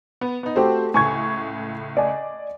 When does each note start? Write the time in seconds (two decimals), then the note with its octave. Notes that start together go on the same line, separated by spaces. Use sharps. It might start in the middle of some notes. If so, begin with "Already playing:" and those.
0.21 B3
0.43 B3 D#4
0.56 A3 C4 F#4 G4 C5
0.94 C#2 A2 G#5 C#6 G#6
1.97 D5 D#5 G#5